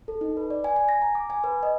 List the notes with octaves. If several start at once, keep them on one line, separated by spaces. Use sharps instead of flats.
A4
D#4
B4
D5
G#5
G#5
A#6
A#5
D6
G#5
B4
D#5